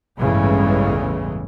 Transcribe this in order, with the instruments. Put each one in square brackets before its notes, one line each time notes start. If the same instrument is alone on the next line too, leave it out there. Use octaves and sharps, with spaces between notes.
[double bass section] A1 E2 G2 C#3 E3 G#3